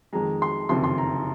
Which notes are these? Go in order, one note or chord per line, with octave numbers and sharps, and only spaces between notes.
F2 D#3 G#3 A#5
C6
F#1 F2 C3 D#3 C6
C6
A#5